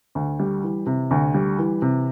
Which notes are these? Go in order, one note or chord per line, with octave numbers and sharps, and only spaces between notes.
D2
G3
E3
C3
D2
G3
E3
C3